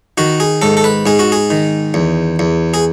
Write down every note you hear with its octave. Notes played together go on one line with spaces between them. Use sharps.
D#3 F#4
G#4
G#2 A4
A4
B4
G#2 G#4
F#4
G#4
D#3
E2
E2
G#4